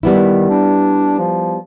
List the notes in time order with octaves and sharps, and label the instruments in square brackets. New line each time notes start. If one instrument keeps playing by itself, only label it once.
[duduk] D#3 [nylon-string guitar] G3 B3 E4
[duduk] D4
F3